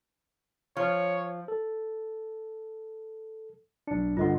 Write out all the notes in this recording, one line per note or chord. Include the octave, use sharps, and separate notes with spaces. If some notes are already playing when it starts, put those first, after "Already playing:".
F3 C#5
A4
B1 D4 C#7
G2 D3 F4 D#5 F#5 C6